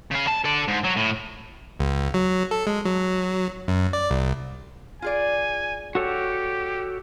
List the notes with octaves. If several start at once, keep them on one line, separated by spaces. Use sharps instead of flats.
C#3 F5
A5
A4 D5
G#2
F#3
A2
C#2
F#3
A4
G#3
F#3
F#2
D5
C2
F4 G#4 D5 G#5
F#4 G4 A4 C#5